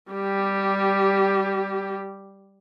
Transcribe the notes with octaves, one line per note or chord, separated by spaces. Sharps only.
G3 G4